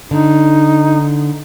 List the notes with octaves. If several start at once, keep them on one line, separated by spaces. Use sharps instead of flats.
D3 D#4